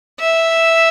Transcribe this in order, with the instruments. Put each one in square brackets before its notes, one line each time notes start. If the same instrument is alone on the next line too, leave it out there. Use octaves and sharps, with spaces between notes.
[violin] E5